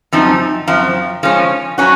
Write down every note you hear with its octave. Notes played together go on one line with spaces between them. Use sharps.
F#2 F3 C4 D#4
F#2 F3 C4
F3 G#3 C#4
F#3 C#4 F#4